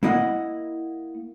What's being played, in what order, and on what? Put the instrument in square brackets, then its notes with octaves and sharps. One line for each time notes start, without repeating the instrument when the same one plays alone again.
[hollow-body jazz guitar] A#3 E4 D#5 F#5